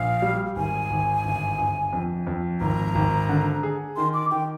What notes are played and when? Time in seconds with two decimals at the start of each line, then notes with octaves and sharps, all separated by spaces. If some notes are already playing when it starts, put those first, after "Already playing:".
Already playing: A#1 F5
0.22 G3
0.56 G#1 G#5
0.90 G#1
1.25 G1
1.58 G1
1.93 F2
2.27 F2
2.61 G#1 A#5
2.95 G#1
3.29 D3
3.63 G#4
3.97 D#3 C6
4.14 D6
4.31 D#3 G5